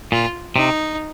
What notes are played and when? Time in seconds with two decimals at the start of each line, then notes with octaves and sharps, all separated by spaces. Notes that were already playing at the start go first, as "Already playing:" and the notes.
0.12 A#2 F4
0.56 C3 D#4